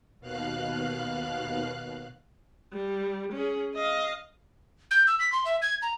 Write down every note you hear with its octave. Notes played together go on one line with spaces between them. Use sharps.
D#2 B2 F5 F#6
G3
C#4 G#4
D#5 F5
G6
E6
B6
C6
E5
G#6
A#5